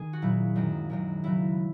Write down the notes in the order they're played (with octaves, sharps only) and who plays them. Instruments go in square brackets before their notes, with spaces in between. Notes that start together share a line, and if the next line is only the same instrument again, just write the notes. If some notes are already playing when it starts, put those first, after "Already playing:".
Already playing: [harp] D#3 G#4
F#4
A#2 F#3 E4
F#2 D#3 G#3
F#2 D#3 G#3
F#2 C#3 F#3 E4